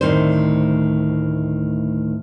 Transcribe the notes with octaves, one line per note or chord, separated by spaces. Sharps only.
D2 A2 D#3 C4 C5